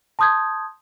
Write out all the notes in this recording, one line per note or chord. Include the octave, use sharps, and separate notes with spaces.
A5 C6 D#6 G6 G#6